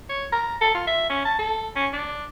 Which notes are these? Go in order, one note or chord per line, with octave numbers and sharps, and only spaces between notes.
C#5
A#5
A4
F4
E5
C#4
A5
A4
C#4
D4